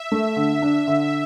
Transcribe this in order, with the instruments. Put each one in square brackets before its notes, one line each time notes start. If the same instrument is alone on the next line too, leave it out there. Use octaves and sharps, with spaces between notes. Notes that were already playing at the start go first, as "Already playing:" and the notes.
Already playing: [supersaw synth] E5
[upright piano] A3
D3
D4
D3